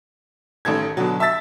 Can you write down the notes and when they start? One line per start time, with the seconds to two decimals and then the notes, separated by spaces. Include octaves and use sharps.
0.65 A1 D#3 A4 G#6
0.97 B2 D3 F#3
1.20 E5 A5 E6 A6 B6